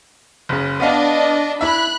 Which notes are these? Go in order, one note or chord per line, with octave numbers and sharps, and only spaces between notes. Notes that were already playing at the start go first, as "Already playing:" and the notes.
F#1 C#3
B3 D4 D#5 F5
E4 E5 B5 F#6